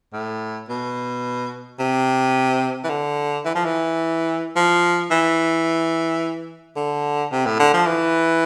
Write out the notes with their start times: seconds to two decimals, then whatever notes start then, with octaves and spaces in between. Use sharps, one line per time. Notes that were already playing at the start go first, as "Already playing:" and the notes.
0.13 A2
0.69 B2
1.79 C3
2.84 E3
2.90 D3
3.45 E3
3.55 F3
3.65 E3
4.56 F3
5.11 E3
6.76 D3
7.32 C3
7.46 A2
7.59 D3
7.74 F3
7.87 E3